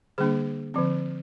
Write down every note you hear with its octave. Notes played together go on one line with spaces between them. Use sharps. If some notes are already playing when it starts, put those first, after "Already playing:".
D3 G3 A#3 D4 G#4
D3 F3 C4